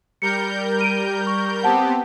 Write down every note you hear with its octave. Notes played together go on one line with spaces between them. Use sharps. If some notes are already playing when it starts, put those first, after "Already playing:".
G3 A#4 G6 C#7
D7 D#7
C#6
B3 C4 G4 F#5 A5